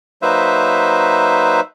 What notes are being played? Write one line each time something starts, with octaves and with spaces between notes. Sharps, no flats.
F#3 A#3 D#4 B4 C5 E5